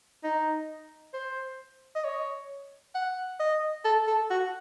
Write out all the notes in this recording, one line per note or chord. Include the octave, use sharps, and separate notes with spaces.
D#4
C5
D#5
C#5
F#5
D#5
A4
A4
F#4